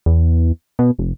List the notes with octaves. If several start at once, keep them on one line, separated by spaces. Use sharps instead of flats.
E2
B2
F1